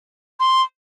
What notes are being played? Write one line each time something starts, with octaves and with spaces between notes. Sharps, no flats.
C6